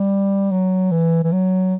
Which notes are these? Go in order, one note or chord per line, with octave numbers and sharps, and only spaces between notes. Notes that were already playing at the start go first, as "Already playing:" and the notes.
Already playing: G3
F#3
E3
E3
F#3